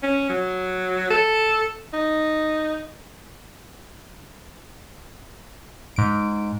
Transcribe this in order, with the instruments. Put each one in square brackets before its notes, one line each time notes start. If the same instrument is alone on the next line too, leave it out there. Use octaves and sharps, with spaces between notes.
[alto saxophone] C#4
F#3
A4
D#4
[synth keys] G#2 D7